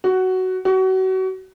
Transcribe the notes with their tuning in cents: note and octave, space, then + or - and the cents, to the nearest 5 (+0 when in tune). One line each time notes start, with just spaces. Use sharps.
F#4 +10
F#4 +30